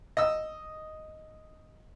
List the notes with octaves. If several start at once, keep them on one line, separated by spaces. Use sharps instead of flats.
D#5 E6